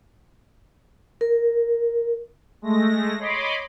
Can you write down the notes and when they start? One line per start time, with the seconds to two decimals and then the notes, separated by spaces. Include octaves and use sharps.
1.21 A#4
2.62 G#3 A3 A#6
3.19 C#5 D#5 B5 C6 D6